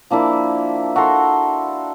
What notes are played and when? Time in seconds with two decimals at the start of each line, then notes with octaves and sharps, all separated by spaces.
0.11 F3 A#3 D4 E4
0.96 F#4 A4 A#5 C6